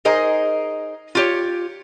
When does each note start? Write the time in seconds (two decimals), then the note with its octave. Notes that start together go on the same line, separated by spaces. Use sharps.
0.05 D#4 G#4 A#4 C5 D#5
1.15 F4 G4 C#5